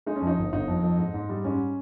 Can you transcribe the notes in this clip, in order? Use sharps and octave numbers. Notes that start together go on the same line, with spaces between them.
G#3 D#4
C#4
F2
D#4
G1
G1 D#4
F2
F2
G#2
G#2
G3
G#2 C#4